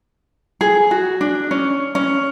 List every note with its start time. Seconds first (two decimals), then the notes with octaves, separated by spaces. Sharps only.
0.61 G#4
0.91 F#4
1.21 D4
1.51 C#4
1.95 C#4